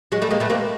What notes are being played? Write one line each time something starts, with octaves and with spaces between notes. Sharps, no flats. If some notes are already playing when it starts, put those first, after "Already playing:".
F#3 G#3
G3 A3
G#3 A#3
A3 B3
A#3 C4